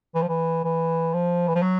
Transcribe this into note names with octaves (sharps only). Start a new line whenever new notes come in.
E3
F3
E3
E3
F3
E3
F3
F#3